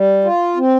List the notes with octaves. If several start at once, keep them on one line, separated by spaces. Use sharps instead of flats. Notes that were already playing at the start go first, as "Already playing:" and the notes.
Already playing: G3
F4
C4